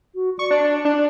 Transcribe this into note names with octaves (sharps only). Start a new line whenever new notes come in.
F#4
D5 C#6
D4
D4